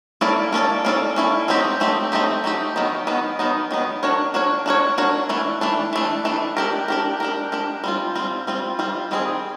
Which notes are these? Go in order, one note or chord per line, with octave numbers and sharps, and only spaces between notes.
A#3 C#4 E4 A4 D5
A#3 C#4 E4 A4 D5
A#3 C#4 E4 A4 D5
A#3 C#4 E4 A4 D5
F#3 A3 C4 D#4 G4
F#3 A3 C4 D#4 G4
F#3 A3 C4 D#4 G4
F#3 A3 C4 D#4 G4
D#3 F#3 B3 D#4
D#3 F#3 B3 D#4
D#3 F#3 B3 D#4
D#3 F#3 B3 D#4
D4 F#4 A#4 C#5
D4 F#4 A#4 C#5
D4 F#4 A#4 C#5
D4 F#4 A#4 C#5
E3 A3 D4
E3 A3 D4
E3 A3 D4
E3 A3 D4
D4 G4 A#4
D4 G4 A#4
D4 G4 A#4
D4 G4 A#4
G3 C4 F4
G3 C4 F4
G3 C4 F4
G3 C4 F4
D#3 G3 C4 D#4 G#4